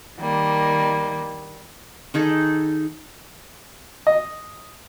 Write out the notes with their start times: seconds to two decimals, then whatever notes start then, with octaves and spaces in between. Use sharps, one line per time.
0.18 D#3 G3 A#3
2.14 D#3 D#4 G#4 A4
4.07 D#5